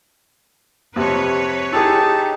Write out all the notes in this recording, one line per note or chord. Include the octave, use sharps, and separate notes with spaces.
F2 C3 B4 C#5
D#4 E4 G4 G#4 A5